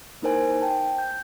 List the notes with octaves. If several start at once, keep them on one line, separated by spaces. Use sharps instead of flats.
A#3 D#4 E4 A#4 C5 G#5
G5 A5
G6